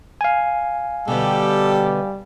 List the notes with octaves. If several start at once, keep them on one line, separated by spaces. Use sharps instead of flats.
F5 G#5
B2 D3 G3 B3 G4 A4